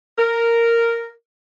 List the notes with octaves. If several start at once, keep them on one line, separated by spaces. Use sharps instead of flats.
A#4